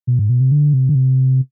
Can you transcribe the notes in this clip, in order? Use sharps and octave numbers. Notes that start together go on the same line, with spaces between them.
B2
G#2
B2
C3
D3
C3
D3
C3